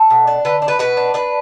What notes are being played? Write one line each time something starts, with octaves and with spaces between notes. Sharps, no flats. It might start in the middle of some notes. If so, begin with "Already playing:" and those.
Already playing: A4
B2
D4
D3 B4
D4
B4
B2 B4
D4
D4 B4